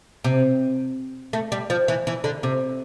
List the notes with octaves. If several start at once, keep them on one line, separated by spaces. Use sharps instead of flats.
C3
A3
G3
F3
E3
E3
D3
C3